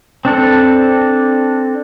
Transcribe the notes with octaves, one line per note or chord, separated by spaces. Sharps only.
C4 D4 A4